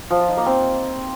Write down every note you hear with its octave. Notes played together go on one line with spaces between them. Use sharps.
F3
F4
D#4
A#3
C4